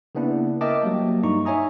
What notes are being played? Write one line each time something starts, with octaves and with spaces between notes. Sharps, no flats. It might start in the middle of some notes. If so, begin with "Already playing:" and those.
C#3 A#3 B3 D4 E4
A#4 D#5 E5 G5 A5 D6
F#3 G3 A#3
G2 D#4 A#5 C#6
D#4 C#5 E5 G#5 A#5 D#6